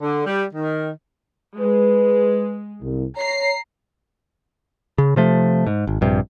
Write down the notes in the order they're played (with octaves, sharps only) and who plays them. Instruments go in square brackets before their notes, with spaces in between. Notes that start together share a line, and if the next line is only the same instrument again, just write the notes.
[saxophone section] D3
G3
D#3
[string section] G#3 [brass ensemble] B4
[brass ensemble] C2
[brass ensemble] C#5 [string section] A#5 C7
[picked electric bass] C#3
C3 F3 A3
G#2
G#1
A#1 G2 C3